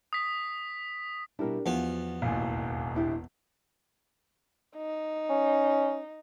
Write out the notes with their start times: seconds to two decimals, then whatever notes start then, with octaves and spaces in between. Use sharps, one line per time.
0.13 D#6 B6
1.39 B2 G3 D4 E4 G4 A#4
1.66 E2 F3 B3 F4 F#4
2.22 E1 A1 D#2 F5 G#5
2.95 D4 E4 G4
4.77 D#4
5.30 C#4